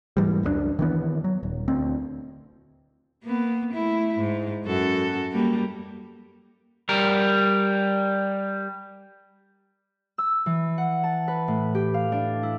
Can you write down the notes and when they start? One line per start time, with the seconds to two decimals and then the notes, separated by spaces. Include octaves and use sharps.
0.17 G#2 E3 G3
0.43 C#2 F#2 A3 D4
0.79 D#3 E3 B3
1.24 F#3
1.43 D#1
1.68 D2 C4
3.23 A#3 B3
3.73 A3 E4
4.18 G#2
4.65 F#2 F#4 A4
5.32 G3 A#3
6.89 G3 A#4
10.18 E6
10.46 E3
10.78 F#5
11.03 A5
11.28 B4
11.48 A2
11.75 G4
11.94 F5
12.12 D4
12.43 E4